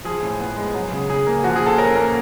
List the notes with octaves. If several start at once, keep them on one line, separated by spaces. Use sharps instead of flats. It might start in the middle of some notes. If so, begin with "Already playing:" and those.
F3 G#4
A2
B3
G#3
F#3
C#3
C#3 G#4
A#3
F3 F#4
G#4
A#2
A4
C#4 A#4
A#3